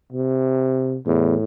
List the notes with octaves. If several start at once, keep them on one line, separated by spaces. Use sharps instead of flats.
C3
E2 A2